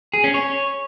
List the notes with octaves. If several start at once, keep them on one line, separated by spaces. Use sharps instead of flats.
G#4
C#4
C#5